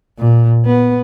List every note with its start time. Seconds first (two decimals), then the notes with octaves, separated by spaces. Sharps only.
0.18 A#2
0.66 B3